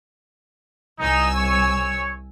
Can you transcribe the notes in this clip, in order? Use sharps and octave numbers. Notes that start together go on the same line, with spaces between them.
C2 D#4 G#5 E6
C#5